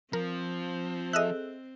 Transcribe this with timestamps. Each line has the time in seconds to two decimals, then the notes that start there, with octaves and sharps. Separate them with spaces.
0.13 F3 C4 A#4
1.13 G#4 A4 D#5 E5 E6 F#6